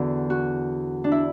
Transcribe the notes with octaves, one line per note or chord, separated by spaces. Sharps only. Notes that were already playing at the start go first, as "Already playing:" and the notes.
Already playing: E2 D3 F#4
F#4
D4
E4